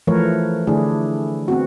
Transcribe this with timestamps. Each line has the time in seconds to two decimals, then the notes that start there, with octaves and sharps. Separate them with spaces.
0.07 E3 F3 A3 A#4 B4 C#5
0.67 D3 A3 D4 E4 G#4
1.48 B3 C4 F#4